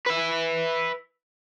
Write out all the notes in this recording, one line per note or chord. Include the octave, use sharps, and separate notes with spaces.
B4 E5